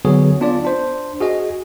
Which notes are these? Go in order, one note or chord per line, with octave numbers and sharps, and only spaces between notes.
D3 F#3 B3 G#4 C#5
B3 D4 F4 D5
D4 C5
F#4 G#4 D#5